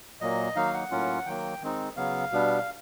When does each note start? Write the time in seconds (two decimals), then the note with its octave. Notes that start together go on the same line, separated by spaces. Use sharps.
0.21 A#2 F#3 A#3 D#5
0.56 D#3 F#3 A#3 D#4 F5
0.74 F#5
0.91 A2 F#3 A#3 C#4 F4
1.26 D#3 F#3 A#3 G5
1.61 D#3 G#3 C4 D#4
1.96 C#3 F#3 B3 F5
2.32 B2 G3 B3 D4